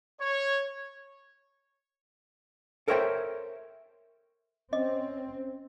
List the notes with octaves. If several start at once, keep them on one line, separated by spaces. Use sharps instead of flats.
C#5
A4 A#4 C5 C#5 E5 G5
C4 C#4 D#5